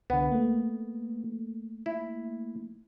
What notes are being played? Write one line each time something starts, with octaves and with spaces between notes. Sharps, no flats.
C2 D3 B3
A3 A#3
E4